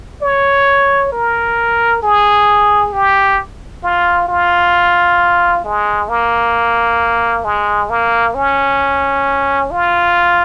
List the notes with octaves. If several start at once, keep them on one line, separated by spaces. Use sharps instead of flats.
C#5
A#4
G#4
G4
F4
F4
G#3
A#3
G#3
A#3
C#4
F4